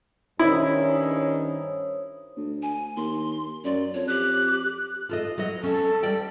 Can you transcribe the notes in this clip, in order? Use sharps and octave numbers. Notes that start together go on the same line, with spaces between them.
G2 D#3 C#4 E4 C5 C#5 D#6
D2
G#5
D#2 C6
F#2 D5
F2 C#5
G4 F#6
F4 A4 D#5
F#3 D#5
C#4 A4
G3 D5 G5